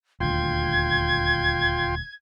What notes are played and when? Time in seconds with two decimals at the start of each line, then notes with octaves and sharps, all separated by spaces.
0.20 D#1 D2 F4 G5 C6 G#6